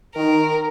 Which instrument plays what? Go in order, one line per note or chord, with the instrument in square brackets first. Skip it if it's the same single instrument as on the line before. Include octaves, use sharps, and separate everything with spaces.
[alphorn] D#3 [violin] A#4